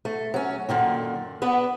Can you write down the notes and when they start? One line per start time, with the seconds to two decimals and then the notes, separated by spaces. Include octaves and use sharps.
0.05 A3
0.34 F#3 C#4
0.69 F#2 A#2 D3 D#3
1.42 B3 D4 B4